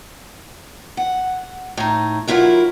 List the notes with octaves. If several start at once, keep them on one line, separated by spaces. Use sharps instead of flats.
F#5
A2 D#4
D#2 F#3 E4 F4 A#4